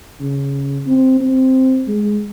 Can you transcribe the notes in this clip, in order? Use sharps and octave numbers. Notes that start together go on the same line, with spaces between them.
C#3
C4
C4
G#3